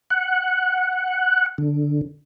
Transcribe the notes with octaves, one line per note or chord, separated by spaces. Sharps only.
F#5
D3